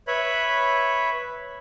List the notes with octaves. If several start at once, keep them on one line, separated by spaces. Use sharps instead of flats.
B4 C#5 E5 B5